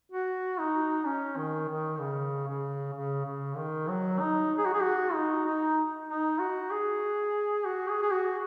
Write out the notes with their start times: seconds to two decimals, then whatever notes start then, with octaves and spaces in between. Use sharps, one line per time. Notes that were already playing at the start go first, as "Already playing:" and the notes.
0.12 F#4
0.59 D#4
1.06 C#4
1.37 D#3
1.69 D#3
1.99 C#3
2.48 C#3
2.94 C#3
3.25 C#3
3.57 D#3
3.88 F#3
4.20 D#4
4.58 G#4
4.66 F#4
4.73 G#4
4.82 F#4
5.14 D#4
5.46 D#4
6.08 D#4
6.39 F#4
6.71 G#4
7.65 F#4
7.89 G#4
8.02 G#4
8.12 F#4